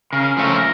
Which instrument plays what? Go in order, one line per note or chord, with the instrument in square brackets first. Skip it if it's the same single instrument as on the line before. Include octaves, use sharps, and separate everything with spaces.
[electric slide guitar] C#3 [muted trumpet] A#4
[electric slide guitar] F3 A3 C#4